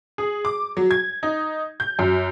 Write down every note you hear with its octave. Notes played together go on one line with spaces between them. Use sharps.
G#4
D6
F#3
G#6
D#4
G6
F#2